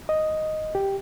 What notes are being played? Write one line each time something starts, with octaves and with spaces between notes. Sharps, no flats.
D#5
G4